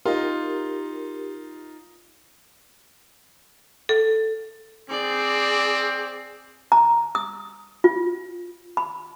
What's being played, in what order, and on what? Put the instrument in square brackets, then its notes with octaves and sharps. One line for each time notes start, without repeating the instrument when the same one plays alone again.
[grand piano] D#4 F4 [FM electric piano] G4 A#4
[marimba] A4
[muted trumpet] C4 [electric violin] G#4 D5
[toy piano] A#5
D#6
F4
B5